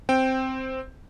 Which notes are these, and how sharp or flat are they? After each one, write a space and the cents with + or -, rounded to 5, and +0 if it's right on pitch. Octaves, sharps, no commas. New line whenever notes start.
C4 +0 G5 +0